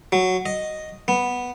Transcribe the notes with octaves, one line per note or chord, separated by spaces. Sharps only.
F#3
D#5
B3